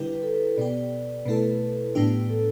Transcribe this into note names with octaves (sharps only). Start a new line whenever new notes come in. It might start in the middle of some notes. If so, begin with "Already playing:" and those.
Already playing: D3 G3 E4 G4 B4
B4
A4
B4
B2 B3 G4 D5
B2 A3 E4 A4 B4
A2 E3 B3 D4 G4
A4